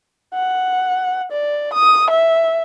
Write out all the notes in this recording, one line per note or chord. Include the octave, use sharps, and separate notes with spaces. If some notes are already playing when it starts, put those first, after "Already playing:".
F#5
D5
D#6
E5